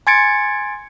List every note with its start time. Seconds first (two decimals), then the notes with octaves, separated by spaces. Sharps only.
0.07 G#5 C6 G#6 A6 C#7 D7